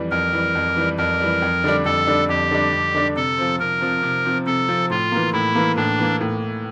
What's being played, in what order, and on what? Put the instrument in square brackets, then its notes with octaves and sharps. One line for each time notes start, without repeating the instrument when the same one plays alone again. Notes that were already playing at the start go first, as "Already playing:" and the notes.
Already playing: [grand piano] F2 E3 G3
[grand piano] F2 [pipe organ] A#4
[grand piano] E3 G3
F2
E3 G3
[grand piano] F2 [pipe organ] A#4
[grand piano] E3 G3
F2
D3 G3 D4
[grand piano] F2 [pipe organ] A4
[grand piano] D3 G3 D4
[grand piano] F2 [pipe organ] G4
[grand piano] D3 G3 D4
F2
D3 G3 D4
[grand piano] C3 [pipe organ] A4
[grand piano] F3 C4
[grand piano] C3 [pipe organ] A#4
[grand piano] F3 C4
C3
F3 C4
[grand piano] C3 [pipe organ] A4
[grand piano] F3 C4
[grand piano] A2 [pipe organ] F4
[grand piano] E3 A#3
[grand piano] A2 [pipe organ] E4
[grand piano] E3 A#3
[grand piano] A2 [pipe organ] D4
[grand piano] E3 A#3
A2